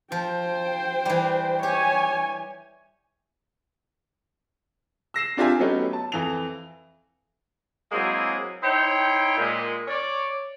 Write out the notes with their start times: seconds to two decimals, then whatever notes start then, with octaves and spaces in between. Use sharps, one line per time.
0.12 F3 C5 G5
1.06 E3 G3
1.63 G4 C#5 G#5
5.14 E6 A#6 C7 E7
5.37 C4 D4 F4 G4 E5 G#5
5.59 F#3 A3 B3 C#4 D#4 G4
5.93 A5
6.12 F2 E3 F7
7.92 F#3 G#3 A#3 C4 E4 G#4
8.63 D#4 E4 C5 C#5 G5
9.37 A#2 G#3
9.88 C#5 D5